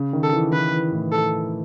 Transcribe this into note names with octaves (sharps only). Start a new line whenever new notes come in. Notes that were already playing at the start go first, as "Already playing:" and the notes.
Already playing: C#3
D#3
A4
E3
E3 B4
E3
A2
A4